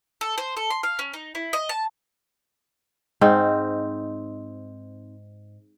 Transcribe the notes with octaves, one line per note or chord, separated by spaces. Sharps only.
A4
C5
A4
C6
F5
C#4
D#4
E4
D#5
A5
G#2 C4 D#4